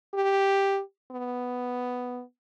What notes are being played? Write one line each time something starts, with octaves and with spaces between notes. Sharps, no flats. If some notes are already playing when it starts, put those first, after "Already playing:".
G4
B3